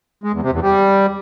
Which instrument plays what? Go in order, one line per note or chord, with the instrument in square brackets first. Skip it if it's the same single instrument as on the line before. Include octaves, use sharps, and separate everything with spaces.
[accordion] G#3
E2
C3
E2
G3